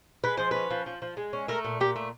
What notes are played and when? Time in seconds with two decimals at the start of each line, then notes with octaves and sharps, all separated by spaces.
0.24 G#3 B4
0.37 F3 C5
0.51 C#4 B4
0.71 F3
0.86 F3
1.02 F3
1.17 G#3
1.33 C#4
1.48 A3 A#4
1.65 A#2
1.80 A#2 G4
1.96 A3